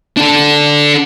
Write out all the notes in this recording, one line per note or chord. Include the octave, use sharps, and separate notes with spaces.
D4 A4